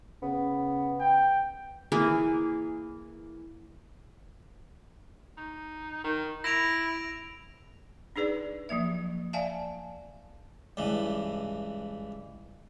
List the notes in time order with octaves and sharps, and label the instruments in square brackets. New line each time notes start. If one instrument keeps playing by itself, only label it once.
[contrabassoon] C#3 [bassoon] B3
[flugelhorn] G5
[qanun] E3 A#3 G#4
[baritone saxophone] D#4
D#3
[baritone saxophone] E4 [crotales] A#6 D7 F7
[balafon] D4 D#4 G#4 B4 D5
F3 F#3 A#3 E5
D5 E5 F5 G#5 A5
[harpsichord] C#2 G2 E3